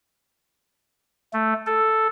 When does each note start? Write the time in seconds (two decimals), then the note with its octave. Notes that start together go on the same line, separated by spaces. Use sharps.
1.33 A3
1.66 A4